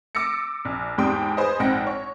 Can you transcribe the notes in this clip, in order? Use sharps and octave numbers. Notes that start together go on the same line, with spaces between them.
D6 E6 A6 A#6 C#7
A#1
E2 G#2 G3 G5 C6 D#6
G#4 B4 C5 D#5
A#1 G#2 C4 F#5 G5 A#6
C#5